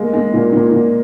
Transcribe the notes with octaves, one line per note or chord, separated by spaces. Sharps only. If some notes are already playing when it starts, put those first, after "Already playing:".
Already playing: G#3 A#3
G#3
A#2
A#2
A#2